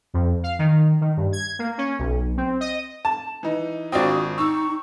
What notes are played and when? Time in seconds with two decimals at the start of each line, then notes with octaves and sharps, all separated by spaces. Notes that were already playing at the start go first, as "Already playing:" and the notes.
0.14 F2
0.43 F5
0.59 D#3
1.01 D#3
1.17 G2
1.33 G#6
1.59 A#3
1.78 C#4
1.99 B1
2.37 C4
2.61 D#5
3.05 A5
3.43 E3 D#4
3.92 G#1 C4 D4 F4 F#4 D#6
4.38 D#4 C#6 E6